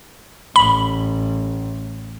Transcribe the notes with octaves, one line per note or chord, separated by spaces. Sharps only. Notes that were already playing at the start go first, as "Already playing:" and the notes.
A1 B5